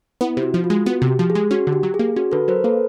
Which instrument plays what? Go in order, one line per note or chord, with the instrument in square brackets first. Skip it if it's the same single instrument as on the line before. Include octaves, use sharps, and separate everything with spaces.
[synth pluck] B3 [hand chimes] E4
[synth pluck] C3
[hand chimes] F#4
[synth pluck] F3
[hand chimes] F4
[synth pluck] G#3
[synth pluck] B3 [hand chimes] F#4
[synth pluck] C3
[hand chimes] G4
[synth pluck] F3
[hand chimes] G#4
[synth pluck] G#3
[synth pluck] C#4 [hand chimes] F#4
[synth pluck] D3
[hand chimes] G4
[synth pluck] F#3
[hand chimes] G#4
[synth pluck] A#3
[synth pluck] C#4 [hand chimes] F#4
[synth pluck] D3 [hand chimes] A4 B4
[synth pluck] F#3 [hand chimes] A#4 C5
[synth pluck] A#3 [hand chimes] A4 B4